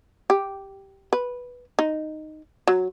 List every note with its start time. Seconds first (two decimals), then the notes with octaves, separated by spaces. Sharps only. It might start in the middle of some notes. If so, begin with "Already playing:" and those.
0.30 G4
1.13 B4
1.79 D#4
2.68 F#3